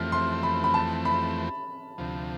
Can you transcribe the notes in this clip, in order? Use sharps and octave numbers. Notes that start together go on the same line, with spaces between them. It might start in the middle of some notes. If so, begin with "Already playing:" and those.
Already playing: F2 E3 A3 C4 F6
C6
B5
B5
A5
B5
D2 C3 F3